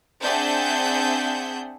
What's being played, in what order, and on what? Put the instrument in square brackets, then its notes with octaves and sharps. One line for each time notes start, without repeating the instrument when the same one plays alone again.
[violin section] C4 D4 G#4 E5 F#5 G6